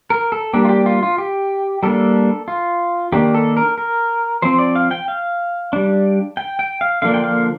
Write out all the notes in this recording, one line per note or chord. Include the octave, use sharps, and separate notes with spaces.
A#4
A4
G3 A#3 D4 G4
F4
G4
F4
F4
G4
G3 A#3 D4 A4
F4
D#3 A#3 D4 G4
A4
A#4
A#4
F3 C4 C5
D5
F5
G5
F5
G3 D4
G5
G5
F5
D3 F3 A#3 D4 F5
G5
F5